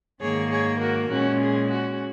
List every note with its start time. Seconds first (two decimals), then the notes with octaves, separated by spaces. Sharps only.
0.21 G#2 D#3 A#3 G#4 C#5
0.50 G#4 C#5
0.80 F#4 A#4
1.10 A#2 G#3 C#4 F#4
1.40 G#4
1.70 F#4